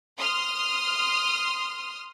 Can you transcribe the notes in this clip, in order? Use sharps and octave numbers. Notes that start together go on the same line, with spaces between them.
C6 D#6 F6